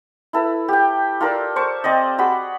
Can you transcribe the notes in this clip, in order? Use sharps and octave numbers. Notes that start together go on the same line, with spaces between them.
E4 A4 B4
G4 G5
F4 A4 A#4 D5
C5 A5 C#6
C4 D5 D#5
F#4 G#4 B5